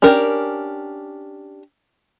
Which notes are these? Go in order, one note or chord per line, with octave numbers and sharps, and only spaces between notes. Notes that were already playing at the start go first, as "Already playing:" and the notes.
C#4 D4 G4 A#4